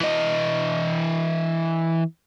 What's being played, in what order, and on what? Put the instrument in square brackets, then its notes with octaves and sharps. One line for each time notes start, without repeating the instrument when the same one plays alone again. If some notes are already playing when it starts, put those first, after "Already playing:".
[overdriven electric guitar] E3 D#5